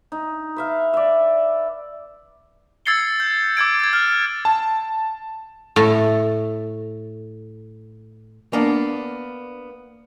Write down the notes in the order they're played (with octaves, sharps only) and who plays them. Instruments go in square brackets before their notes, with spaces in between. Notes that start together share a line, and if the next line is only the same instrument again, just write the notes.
[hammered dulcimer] D#4
B4 E5 F5
D5 E5
[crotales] E6 G#6 A6 C7 C#7 G7
G6
D6 E6 G#6 D7
G#6 A6
F6
[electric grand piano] A5
[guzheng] A2 A4
[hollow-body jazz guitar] A#3 B3 D4